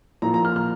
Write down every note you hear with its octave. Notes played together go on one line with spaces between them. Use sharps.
A#2 F3 A#5
A#5
F6
F6